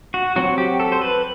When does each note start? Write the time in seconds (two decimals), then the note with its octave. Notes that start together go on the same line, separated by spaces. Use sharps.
0.14 F#4
0.36 F#3 C4 F#4
0.58 G4
0.80 A4
0.92 C5
1.01 B4